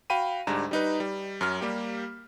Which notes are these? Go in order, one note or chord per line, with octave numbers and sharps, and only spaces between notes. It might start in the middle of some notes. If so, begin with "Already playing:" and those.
F#4 F5 G5 B5 D#7
D2 G#2 G3 D4 A#5
G3 D#4 B4
G3
F#2 F#3 F6
G3 A#3 G4